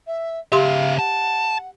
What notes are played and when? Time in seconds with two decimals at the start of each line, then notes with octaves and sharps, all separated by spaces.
0.06 E5
0.52 C#3 G4 E5 F5 C6
0.99 F#5 A5